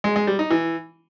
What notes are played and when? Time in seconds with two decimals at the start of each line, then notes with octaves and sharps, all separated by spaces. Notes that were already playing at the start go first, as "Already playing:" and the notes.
0.04 G#3
0.16 G#3
0.27 G3
0.39 D#4
0.51 E3